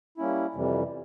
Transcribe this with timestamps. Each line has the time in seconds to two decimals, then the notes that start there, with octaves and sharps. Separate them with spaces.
0.18 G3 A#3 C#4 E4
0.54 F2 C3 E3 G3